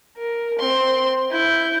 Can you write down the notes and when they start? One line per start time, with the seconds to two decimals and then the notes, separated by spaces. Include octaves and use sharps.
0.18 A#4
0.60 C4 C6
1.32 E4 G6